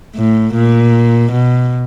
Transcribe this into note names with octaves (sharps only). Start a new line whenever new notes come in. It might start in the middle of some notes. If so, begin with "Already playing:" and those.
A2
A#2
B2